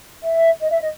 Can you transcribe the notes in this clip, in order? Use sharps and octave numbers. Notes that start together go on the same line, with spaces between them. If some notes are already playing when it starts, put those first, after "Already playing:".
E5
D#5
E5
D#5